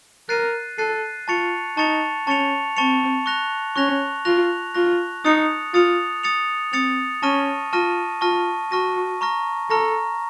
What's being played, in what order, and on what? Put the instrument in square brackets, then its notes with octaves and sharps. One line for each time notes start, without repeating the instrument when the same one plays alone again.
[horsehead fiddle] A#4 [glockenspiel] F#6 A6 C7 D#7
[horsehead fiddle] A4 [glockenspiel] F#6 A6 C7 D#7
[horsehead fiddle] F4 [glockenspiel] A5 C#6 A6 C#7 F7
[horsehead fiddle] D#4 [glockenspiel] A5 C#6 A6 C#7 F7
[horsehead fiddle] C#4 [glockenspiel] A5 C#6 A6 C#7 F7
[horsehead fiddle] C4 [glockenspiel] A5 C#6 A6 C#7 F7
[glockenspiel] C#6 F#6 A#6 F7
[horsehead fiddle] C#4 [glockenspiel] C#6 F#6 A#6 F7
[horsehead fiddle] F4 [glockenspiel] C#6 F#6 A#6 F7
[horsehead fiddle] F4 [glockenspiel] C#6 F#6 A#6 F7
[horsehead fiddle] D#4 [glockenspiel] D#6 A6 C#7 F7
[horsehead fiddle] F4 [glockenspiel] D#6 A6 C#7 F7
[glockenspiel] D#6 A6 C#7 F7
[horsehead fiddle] C4 [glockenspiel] D#6 A6 C#7 F7
[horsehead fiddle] C#4 [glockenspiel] A5 C#6 F6 A#6 D#7
[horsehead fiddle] F4 [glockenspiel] A5 C#6 F6 A#6 D#7
[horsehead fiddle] F4 [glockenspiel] A5 C#6 F6 A#6 D#7
[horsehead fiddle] F#4 [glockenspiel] A5 C#6 F6 A#6 D#7
[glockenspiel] A#5 C#6 F6 A#6
[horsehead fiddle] A4 [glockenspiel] A#5 C#6 F6 A#6